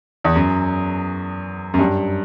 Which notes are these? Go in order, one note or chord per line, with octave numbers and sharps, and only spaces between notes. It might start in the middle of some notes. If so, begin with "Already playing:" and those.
E2
F#2
F#2
G2